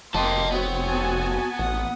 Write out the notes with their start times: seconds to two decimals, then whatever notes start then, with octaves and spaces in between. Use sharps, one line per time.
0.14 F1 A#3 G4 D#5 A5 C6
0.52 B3 C4 F#4 C#5
0.83 F#4 G#5 A5
1.59 A1 F#5 D#6